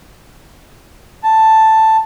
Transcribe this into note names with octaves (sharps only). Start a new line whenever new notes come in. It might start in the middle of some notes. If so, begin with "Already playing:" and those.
A5